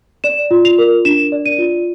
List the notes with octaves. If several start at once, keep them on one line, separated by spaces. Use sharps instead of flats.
D5 E7
F4
F7
A#4
D4 E7
D5
D#7
F4